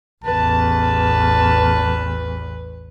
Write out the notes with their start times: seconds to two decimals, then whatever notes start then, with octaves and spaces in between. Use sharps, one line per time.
0.24 A1 E2 B4 A5